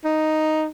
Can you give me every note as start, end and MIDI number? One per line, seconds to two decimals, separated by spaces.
0.04 0.66 63